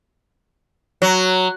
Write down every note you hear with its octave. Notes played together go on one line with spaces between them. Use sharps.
F#3